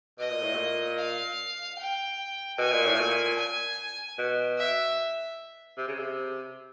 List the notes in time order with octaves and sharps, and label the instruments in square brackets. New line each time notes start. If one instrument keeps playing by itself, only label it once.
[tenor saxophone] B2 [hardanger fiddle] D#5
[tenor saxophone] A#2
A2
A#2
[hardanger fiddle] F5
G5
[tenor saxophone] B2 [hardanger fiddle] G#5
[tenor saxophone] A#2
A2
A#2
[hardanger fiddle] G#5
[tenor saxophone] B2
[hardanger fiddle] E5
[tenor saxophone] C3
C#3
C3